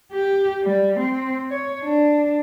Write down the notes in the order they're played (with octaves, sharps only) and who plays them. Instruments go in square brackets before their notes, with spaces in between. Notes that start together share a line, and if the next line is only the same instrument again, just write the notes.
[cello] G4
G3
C4
C#5
D4